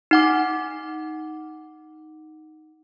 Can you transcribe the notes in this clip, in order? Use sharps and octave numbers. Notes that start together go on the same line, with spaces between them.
D#4 F#5 D6